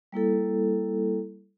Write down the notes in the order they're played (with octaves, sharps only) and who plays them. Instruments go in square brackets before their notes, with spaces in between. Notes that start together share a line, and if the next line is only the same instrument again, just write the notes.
[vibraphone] G3 A#3 E4 A4